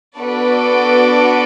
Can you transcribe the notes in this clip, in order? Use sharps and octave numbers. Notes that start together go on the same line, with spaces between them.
B3 D4 F#4 A4 B4 D5